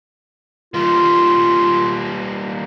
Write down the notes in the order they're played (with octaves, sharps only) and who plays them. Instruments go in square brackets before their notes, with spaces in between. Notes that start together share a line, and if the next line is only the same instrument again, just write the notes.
[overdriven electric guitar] G3 A#3 [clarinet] F4